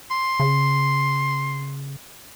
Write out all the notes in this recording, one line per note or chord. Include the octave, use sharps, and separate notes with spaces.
C6
C#3